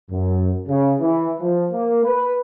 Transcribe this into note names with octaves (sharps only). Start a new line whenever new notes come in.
F#2
C#3
E3
F3
A#3
B4